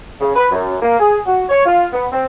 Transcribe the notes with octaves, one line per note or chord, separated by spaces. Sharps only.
C#3
B4
F#2
A#3
G#4
F#4
C#5
F4
B3
C4